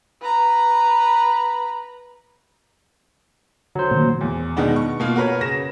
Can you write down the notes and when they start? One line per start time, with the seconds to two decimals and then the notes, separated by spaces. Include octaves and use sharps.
0.21 B4 A#5
3.75 D3 F#3 C5
3.91 A#2 D#3 A#3
4.21 E2
4.56 B2 D#3 G#3 B3 D4 D#4
4.76 C#6
5.00 B2 A#3 F4
5.16 F#4 A#4 B4 C#5
5.41 C#3 A#6 E7